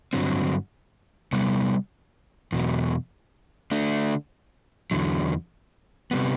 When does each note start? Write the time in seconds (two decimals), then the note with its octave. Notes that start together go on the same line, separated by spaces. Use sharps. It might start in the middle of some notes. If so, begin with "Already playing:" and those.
0.13 G2 D3 F#3 C4
1.32 C3 G3 B3
2.52 E2 B2 F#3
3.71 D3 A3 D4
4.91 E2 D3 F#3
6.11 C3 G3 B3